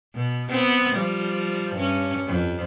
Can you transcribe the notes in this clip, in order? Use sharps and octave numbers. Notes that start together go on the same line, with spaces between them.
B2
B3 C4
F3 G3
G2 C#4
F2